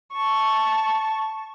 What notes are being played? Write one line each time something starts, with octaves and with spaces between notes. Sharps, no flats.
A5 C#6